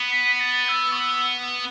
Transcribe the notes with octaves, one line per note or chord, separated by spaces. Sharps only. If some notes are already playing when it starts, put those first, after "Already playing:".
Already playing: B3
B6
B6
A6
E6
C#6
E6